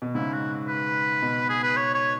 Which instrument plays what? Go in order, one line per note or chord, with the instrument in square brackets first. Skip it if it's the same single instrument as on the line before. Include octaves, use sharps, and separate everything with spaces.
[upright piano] B2
[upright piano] G#2 C#3 [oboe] E4
[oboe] F#4
B4
[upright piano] B2
[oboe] G#4
B4
C#5
C#5